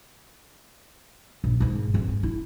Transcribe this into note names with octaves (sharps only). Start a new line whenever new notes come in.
A#1
G#1 G#2
G1 C4
G#2
E4